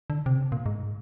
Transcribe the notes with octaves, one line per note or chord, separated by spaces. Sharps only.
D3
C3
C#3
A#2
G#2